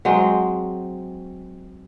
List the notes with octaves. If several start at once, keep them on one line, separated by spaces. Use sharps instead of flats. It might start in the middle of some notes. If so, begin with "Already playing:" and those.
F#3 G#3 C4